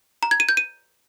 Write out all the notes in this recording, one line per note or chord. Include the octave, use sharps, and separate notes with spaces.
A#5
G#6
D#7
G6
D#7